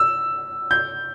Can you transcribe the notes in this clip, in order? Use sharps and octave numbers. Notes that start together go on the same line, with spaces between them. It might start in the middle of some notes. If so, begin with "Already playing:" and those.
Already playing: E6
G6